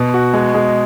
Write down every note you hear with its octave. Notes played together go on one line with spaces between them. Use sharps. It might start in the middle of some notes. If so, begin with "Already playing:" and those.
Already playing: B2
F#4
G#3
G#3